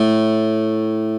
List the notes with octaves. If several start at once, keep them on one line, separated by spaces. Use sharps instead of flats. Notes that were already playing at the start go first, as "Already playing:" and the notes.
Already playing: A2